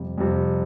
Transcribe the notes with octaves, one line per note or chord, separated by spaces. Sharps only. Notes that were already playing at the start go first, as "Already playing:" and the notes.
Already playing: F2 C3 G3
F2 C3 G3